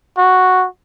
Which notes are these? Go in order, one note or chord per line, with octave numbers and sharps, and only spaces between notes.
F#4